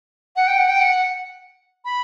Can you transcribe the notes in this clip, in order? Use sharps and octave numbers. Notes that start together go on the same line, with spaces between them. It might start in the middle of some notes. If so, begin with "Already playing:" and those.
F#5
G5
F#5
G5
F#5
B5